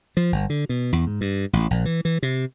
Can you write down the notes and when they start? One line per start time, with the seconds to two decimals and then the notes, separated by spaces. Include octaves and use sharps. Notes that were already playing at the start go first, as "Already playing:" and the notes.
0.17 F3
0.32 G1
0.50 D3
0.69 B2
0.93 E2
1.07 G#2
1.21 G2
1.53 A1
1.71 A#1
1.85 E3
2.05 E3
2.23 C3